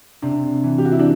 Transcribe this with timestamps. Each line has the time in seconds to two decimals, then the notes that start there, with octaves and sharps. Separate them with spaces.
0.22 C3 D4
0.64 E3
0.78 G4
0.85 F#4
0.92 E4
0.99 D4